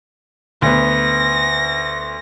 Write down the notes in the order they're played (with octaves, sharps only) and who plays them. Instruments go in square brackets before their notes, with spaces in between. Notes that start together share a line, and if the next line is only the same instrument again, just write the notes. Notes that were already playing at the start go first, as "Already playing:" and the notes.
[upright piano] D2 B3 [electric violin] A#6